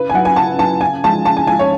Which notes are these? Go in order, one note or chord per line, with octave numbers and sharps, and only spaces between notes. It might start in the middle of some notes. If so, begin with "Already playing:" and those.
Already playing: C#3 B4
G#5
F#3 F#5
G#5
C#3 A5
F#3 A5
C#3 G#5
F3 G#3 A5
C#3 A5
G#5
F3 G#3 G#5
C#5